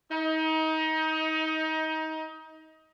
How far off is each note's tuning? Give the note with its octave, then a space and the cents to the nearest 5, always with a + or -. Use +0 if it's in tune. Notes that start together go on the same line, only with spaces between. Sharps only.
D#4 +25